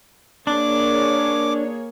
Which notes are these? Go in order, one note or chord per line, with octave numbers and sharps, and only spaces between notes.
A#3 D4 G#4 C#5 D6